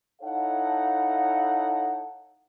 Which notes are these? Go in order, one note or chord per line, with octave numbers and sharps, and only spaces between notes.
D#4 E4 A4 C#5 F5 F#5